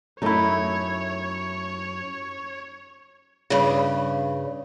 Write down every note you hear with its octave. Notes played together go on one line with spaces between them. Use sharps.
F#2 A3 D#4 E4 C#5
G2 C#3